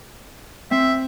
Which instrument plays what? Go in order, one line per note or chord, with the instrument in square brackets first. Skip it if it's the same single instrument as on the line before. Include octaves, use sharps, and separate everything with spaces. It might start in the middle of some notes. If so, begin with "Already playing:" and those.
[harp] C4 [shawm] E5